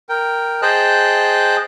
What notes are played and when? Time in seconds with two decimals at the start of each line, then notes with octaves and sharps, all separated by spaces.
0.09 A#4 G5
0.62 G#4 C5 D#5 G5 A5 F#6